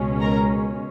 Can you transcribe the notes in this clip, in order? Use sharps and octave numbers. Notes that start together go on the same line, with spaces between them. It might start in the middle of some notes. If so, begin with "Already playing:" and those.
Already playing: C#2 B2 G#3 C#4
A#4 A#5